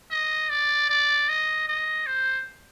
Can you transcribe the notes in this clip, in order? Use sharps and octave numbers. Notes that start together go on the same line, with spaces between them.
D#5
D5
D5
D#5
D#5
C5